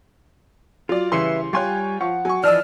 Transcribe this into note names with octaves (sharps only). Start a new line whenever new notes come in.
F#3 F4 D5
C#3 E3 G3 B4 E5 C6 C7 C#7
G3 F4 G4 C#5 G#5 C6 C#6 F#6
F3 F5 F#5 C#6
F#3 G#5 C#6
E3 F3 D5 D#5 A5 E6 F6